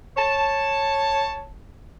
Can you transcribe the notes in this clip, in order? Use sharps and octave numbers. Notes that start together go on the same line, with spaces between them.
C#5 A5